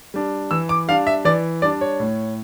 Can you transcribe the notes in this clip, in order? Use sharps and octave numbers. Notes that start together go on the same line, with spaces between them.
G3 D4
E3 E6
D6
G3 D4 F5
E5
E3 D5
G3 D4 D5
C#5
A2